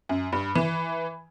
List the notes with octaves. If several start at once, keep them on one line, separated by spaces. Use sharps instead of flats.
F#2
G2
E3